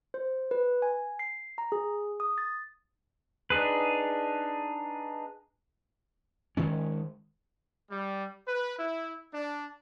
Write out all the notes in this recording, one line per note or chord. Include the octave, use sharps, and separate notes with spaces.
C5
B4
G#5
C7
A#5
G#4
D#6
A6
D4 D#4 G#4 B4
D#3 G#3 C#4
G3
B4
E4
D4